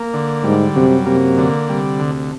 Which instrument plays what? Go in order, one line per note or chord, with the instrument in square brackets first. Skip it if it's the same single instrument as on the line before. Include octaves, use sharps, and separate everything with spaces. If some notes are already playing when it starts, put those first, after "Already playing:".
Already playing: [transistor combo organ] A#3
D3
[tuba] G#2 [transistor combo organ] G3
[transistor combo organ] F#2 [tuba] C3
[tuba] C3 [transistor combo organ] A#3
[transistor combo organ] D3
[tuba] C3 [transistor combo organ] G3
[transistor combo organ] D2